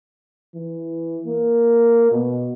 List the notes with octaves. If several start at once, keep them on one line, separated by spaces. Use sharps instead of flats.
E3
A#3
B2